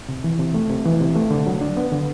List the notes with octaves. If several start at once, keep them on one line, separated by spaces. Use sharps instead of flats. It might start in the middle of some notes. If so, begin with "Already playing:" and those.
C3
E3
C3
A3
C3
E3
C3
A3
D3
F#3
D4
B3
D3